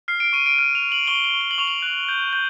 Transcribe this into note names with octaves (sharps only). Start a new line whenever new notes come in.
F6 C7
D7
C#6 D#7
D7
F6 D#7
F7
F6
F#7
C#6 G7
G7
C#6
G7
F#7
C#6 F7
F#7
F#6
G6
G6